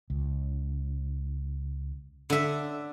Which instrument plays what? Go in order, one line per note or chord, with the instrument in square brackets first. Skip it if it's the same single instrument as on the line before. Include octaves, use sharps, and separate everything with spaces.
[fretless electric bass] C#2
[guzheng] D3 E5